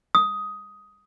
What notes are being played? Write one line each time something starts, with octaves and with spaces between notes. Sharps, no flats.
D#6